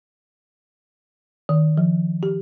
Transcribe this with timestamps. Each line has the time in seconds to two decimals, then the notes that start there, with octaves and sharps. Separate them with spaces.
1.49 D#3
1.78 F3
2.23 G4